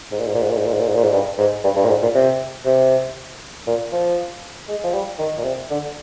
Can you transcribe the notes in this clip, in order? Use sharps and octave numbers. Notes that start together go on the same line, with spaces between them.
G#2
A#2
G#2
A#2
G#2
A#2
G#2
A#2
G#2
A#2
G#2
A#2
G#2
G2
G#2
G2
G2
A#2
G#2
A#2
C3
C3
A#2
F3
G#3
F3
G3
D#3
A#2
C3
D3